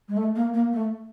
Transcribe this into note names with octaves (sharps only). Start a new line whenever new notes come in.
G#3
A3
A#3
A#3
A3